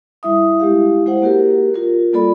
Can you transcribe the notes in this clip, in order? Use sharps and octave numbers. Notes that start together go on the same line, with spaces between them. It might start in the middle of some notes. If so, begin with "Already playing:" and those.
G3 E4 E5 D#6
G#3 E4 G4 F5
G#3 E4 C5 F#5
A#3 F#4 G4 A#4
F4 A#4
G3 A#3 F4 A4 D5 B5